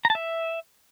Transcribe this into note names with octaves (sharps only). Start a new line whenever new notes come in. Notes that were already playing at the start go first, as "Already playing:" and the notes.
A#5
A5
E5